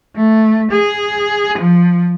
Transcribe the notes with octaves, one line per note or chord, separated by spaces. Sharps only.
A3
G#4
F3